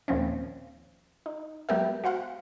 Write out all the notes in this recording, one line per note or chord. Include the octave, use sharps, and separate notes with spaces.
D#2 A#2 F3 C4 C#4
D#4
F#3 G#3 B3 G4 A#4 E5
F#4 C5 F5 F#5